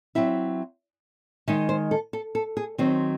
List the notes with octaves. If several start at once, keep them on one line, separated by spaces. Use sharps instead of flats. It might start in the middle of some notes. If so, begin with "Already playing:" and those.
F#3 C4 E4 E5
D#3 G#3 D#4 E5
C5
A4
A4
A4
G#4
D#3 F#3 C4 C5